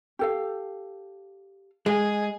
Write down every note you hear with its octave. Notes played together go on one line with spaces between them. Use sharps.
G4 A4 F5
G#3 G#4